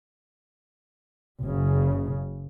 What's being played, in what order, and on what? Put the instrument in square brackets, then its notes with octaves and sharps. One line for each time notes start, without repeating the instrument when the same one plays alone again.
[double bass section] F#1 C#3